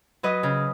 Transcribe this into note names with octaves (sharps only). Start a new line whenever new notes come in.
F#3 B4 D#5
C#3